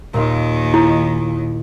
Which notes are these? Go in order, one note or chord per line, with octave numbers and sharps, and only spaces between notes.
D#2 A#2 D#3 F4 F5
E4 C#7